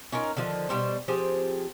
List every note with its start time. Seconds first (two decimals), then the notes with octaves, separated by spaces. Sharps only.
0.12 C#4 D#4 F4 A#4
0.37 D3 D#3 F3
0.69 B2 D#3 G3 C5
1.08 F3 C4 G4 G#4